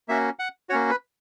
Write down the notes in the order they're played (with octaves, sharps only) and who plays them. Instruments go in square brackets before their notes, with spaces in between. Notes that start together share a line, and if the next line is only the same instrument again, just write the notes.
[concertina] A#3 C#4 F#4 E5
F#5
A#3 C#4 F#4 C#5
B4